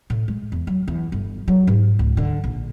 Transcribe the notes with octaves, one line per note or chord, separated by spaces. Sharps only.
A2
G#3
E2
F#3
E2
G1
F#3
G#2
C#2
D3
A#1